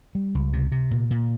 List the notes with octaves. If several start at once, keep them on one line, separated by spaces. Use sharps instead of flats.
G3
C#2
C3
C3
A#2
A#2